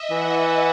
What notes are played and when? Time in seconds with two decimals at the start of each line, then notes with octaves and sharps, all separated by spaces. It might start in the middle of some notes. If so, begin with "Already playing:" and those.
Already playing: D#5 E5
0.11 E3 F#5